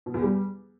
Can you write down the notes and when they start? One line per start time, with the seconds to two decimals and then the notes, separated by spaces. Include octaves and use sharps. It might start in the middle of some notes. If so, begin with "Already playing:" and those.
0.06 B2
0.14 E2
0.22 G3